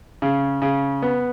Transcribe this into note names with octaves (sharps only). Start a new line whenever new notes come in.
C#3
C#3
B3